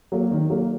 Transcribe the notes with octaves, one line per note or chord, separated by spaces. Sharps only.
F#3 A#3
D#3
F#3 A#3